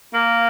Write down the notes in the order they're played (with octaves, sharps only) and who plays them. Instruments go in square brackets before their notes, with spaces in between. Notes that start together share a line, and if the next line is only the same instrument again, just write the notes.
[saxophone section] A#3